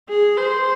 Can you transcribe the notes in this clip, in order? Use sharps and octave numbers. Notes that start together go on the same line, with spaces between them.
G#4
C5